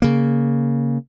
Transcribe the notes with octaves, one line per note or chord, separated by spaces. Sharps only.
C#3 A#3